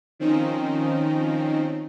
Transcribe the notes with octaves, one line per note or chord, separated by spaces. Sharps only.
D#3 F3 C4 C#4 D#4